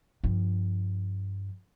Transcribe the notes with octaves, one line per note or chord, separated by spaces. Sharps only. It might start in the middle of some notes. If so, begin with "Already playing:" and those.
G2 F3